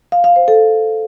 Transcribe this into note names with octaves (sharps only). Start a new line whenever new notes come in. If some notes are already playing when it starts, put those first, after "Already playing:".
F5
F5
C5
A4